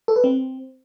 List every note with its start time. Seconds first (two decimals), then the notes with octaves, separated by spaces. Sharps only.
0.08 A4
0.16 B4
0.24 C4